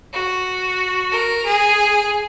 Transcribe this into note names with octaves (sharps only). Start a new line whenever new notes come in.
F#4
A#4
G#4